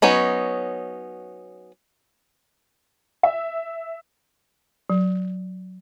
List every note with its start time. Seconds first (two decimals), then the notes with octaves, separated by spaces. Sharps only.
0.02 F#3 B3 C#4 D#4
3.23 E5
4.90 F#3